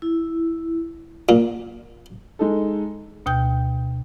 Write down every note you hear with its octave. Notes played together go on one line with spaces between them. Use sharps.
E4
A#2
G#3 D#4 A4
D2 B2 G5 G6